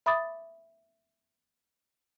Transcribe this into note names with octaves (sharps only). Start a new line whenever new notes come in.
E5 B5 D6 D#6 A6